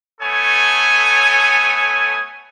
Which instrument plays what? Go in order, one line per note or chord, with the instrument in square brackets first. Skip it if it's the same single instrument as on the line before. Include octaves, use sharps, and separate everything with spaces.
[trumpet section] A3 B3 A4 C#5 G#5 D#6